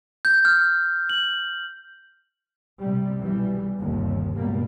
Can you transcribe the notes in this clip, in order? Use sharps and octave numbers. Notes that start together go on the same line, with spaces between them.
G6
F6
F#7
C3 G3
B1 E3 G3
G1 D#2 C3
C#2 G2 B2 G3 A#3